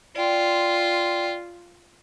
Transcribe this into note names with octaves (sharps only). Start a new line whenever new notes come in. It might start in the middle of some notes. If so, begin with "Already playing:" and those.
F4 D5 G5 C6